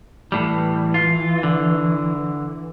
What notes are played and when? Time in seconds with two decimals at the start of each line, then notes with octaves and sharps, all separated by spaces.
0.32 A2 E3 G3
0.94 F4
1.43 D3